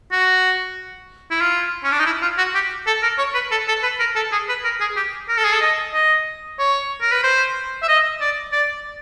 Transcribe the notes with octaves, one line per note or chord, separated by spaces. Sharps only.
F#4
E4
F4
C#4
D4
D#4
E4
F4
F#4
G4
A4
A#4
C#5
B4
A4
A4
B4
A#4
A4
G#4
B4
A#4
G#4
G4
A#4
A4
G#4
A4
D#5
D#5
C#5
A#4
B4
C5
E5
D#5
D5
D5